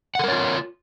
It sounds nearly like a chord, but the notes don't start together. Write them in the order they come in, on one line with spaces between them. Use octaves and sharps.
F#5 A4 A#4 C#5 F4